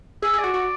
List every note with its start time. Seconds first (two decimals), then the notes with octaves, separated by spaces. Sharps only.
0.22 G#4 E5
0.33 G#4
0.38 D5
0.44 F#4
0.54 F#4